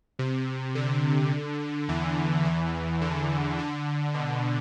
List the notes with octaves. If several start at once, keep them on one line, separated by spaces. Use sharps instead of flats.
C3
D3
E2 E3
E2 E3
D3
D3
B2